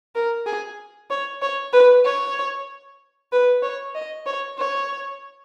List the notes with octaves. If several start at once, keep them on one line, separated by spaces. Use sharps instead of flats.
A#4
G#4
C#5
C#5
B4
C#5
B4
C#5
D#5
C#5
C#5